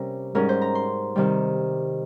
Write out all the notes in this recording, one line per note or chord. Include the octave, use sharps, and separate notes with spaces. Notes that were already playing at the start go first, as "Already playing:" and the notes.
Already playing: C3 G3 C#4 A#4
G#2 G3 C#4 A#4
C5
A#5
C6
C3 D#3 G3